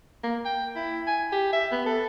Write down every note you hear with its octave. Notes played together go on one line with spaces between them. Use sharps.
A#3
G5
E4
G#5
G4
E5
B3
A4